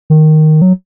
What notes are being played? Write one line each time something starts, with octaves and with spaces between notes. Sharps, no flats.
D#3
F#3